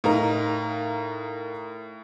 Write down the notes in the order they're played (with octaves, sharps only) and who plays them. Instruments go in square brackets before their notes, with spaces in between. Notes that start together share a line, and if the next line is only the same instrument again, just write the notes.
[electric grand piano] A2 A#5 [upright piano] D#4 A#4 F5